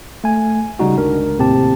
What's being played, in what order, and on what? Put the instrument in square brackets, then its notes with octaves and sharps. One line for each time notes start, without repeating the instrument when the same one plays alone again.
[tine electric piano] A3 G#5
C#3 G3 D#4 F#4
G1 C#2 D4 A#4
D#2 A2 C3 C4 G4 A5